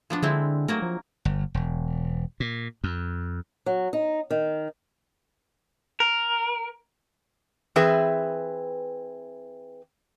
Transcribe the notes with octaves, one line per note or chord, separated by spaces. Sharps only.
F3 B3 D4
D3 G#3 C4 E4
F#3 A3 A#3 A#4
F3
G1
E1
A#2
F2
F#3
D#4
D#3
A#4
E3 C4 G#4 B4 E5